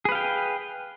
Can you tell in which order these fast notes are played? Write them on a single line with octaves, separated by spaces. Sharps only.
G#4 B4 F5 G5